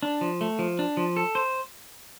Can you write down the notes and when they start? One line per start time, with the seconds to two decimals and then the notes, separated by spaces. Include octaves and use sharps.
0.03 D4
0.21 F3
0.41 A3
0.59 F3
0.79 D4
0.97 F3
1.17 A4
1.35 C5